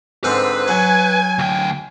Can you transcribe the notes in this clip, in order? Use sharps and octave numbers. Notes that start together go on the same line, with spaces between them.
G#2 D3 C4 B4
F#3 G#5 G#6
D2 G5